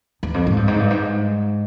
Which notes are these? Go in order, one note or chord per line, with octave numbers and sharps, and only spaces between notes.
E2
F2
G#2
G2
G#2
G2
G#2